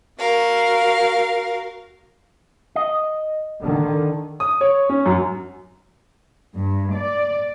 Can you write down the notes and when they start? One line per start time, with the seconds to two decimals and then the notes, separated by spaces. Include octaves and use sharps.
0.19 F#4 A#4 F5
2.76 D#5
3.62 D3 D#3
4.40 D#6
4.61 C#5
4.89 C#4
5.06 F#2
6.57 G2
6.95 D5